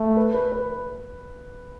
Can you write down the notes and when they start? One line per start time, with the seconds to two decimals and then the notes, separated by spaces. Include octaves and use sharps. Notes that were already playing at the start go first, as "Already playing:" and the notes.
Already playing: A3
0.17 B4
0.34 B4
0.52 B4